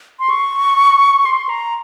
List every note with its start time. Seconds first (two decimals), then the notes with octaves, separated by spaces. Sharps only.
0.19 C6
0.30 C#6
1.25 C6
1.49 A#5